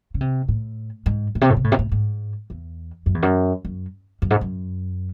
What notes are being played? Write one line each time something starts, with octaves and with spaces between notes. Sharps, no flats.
C#3
C3
A2
G#2
A2
C3
A2
C3
A2
C3
A2
G#2
E2
F#2
E2
F#2
F#2
F#2
G#2
F#2